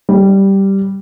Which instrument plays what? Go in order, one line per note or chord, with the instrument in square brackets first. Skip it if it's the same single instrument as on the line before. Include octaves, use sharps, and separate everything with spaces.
[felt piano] G3